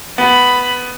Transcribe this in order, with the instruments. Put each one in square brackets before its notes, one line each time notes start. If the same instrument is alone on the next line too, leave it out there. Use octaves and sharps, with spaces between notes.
[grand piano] B3 [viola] B5